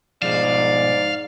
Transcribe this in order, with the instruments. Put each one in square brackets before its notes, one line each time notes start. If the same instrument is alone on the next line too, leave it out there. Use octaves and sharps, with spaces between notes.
[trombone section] G#2 [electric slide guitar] B2 F3 [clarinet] D5 [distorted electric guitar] F5